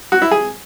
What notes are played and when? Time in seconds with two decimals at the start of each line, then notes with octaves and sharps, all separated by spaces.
0.12 F#4
0.22 E4
0.31 G#4